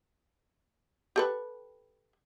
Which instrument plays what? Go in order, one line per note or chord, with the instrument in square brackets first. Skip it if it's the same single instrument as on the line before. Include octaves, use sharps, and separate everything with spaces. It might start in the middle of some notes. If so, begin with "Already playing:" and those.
[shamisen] G4 A4 B4